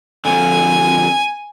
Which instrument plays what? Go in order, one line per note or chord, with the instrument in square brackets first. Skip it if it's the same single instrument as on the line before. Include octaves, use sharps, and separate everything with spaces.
[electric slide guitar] F2 D3 [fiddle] G#5